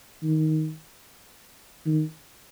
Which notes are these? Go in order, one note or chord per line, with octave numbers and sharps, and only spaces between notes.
D#3
D#3